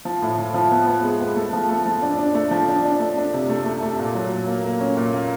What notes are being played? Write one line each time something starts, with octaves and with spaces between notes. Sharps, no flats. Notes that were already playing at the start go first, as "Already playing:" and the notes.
F3
A2
F3
F3
B3
B3
G#3
B3
A3
F3
A3
F3
D4
D4
A3
F3
D4
D4
A3
D4
C3
A3
A3
A3
A#2
F#3
A#2
A#3
A#3
C#4
A#2
A#3